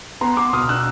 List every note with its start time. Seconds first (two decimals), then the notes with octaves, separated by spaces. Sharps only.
0.21 B3 A#5 C6
0.37 B3 C6 D6
0.53 B2 D#6 F6
0.69 D4 E6 F#6